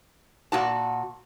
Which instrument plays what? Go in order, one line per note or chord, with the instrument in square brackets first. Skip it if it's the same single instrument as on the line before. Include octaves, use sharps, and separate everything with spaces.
[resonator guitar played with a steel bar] A#2 F#4 A5